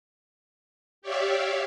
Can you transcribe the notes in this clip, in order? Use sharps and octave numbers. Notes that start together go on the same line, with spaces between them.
G4 C#5 D5 E5 F5